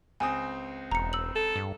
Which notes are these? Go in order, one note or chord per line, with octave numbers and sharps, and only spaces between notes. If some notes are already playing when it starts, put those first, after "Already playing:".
C#2 C4 G#5 D#6
E1 A#5 C#7
E6 F#7
A4
G2